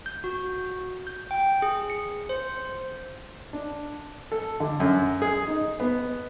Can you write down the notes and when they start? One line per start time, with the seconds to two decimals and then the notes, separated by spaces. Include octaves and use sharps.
0.06 G6
0.24 F#4
1.07 G6
1.31 G5
1.62 G#4
1.90 C#7
2.29 C5
3.53 D4
4.32 A4
4.60 D3
4.80 F#2
5.22 G#4
5.48 D#4
5.80 B3